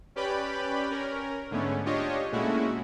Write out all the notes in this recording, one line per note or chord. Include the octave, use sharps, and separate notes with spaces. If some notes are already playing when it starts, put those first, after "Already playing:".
C#4 G4 B4 D5 G5 B5
C#4 A#4
G#2 D3 A3 B3 C#4
D4 F4 G4 C#5 D#5
A#2 G#3 A3 C#4 E4 F#4